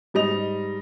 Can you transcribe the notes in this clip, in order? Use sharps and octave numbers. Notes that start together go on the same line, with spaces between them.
G#2 G3 D#5 F7